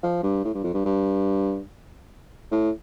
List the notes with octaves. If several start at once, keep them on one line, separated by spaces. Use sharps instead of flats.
F3
G2
A2
G2
F2
G2
G2
A2